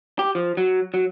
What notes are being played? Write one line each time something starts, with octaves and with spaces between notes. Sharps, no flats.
G4
F3
F#3
F#3